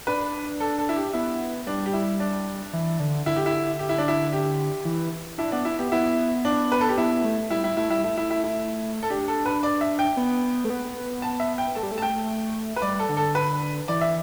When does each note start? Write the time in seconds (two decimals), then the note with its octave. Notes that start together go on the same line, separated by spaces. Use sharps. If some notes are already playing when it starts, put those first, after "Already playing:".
0.07 D4 B4
0.60 A4
0.78 A4
0.89 E4
0.96 G4
1.13 B3 E4
1.66 G3 D4
1.86 G4
1.93 E4
2.20 D4
2.73 E3
2.99 D3
3.26 D3 E4
3.36 G4
3.46 E4
3.79 G4
3.89 E4
3.98 D4
4.08 E4
4.33 G4
4.85 E3
5.38 D4 E4
5.52 B3 D4
5.65 E4
5.79 B3 G4
5.92 B3 E4
6.45 D4
6.72 B4
6.81 A4
6.89 G4
6.97 B3 E4
7.24 A3
7.50 G3 E4
7.64 E4
7.77 A3 E4
7.90 G3 E4
8.04 A3 E4
8.17 E4
8.30 E4
8.44 E4
9.03 A4
9.10 D4 G4
9.28 A4
9.46 B4
9.63 D5
9.81 E5
9.99 G5
10.17 B3
10.64 A3
10.70 B3
11.22 A5
11.40 E5
11.58 G5
11.75 A3 A5
11.83 G3
11.92 A3
11.98 A5
12.02 G5
12.76 B4
12.82 G3 D5
12.99 A4
13.09 D3
13.17 A4
13.35 B4
13.88 E3 D5
14.01 E5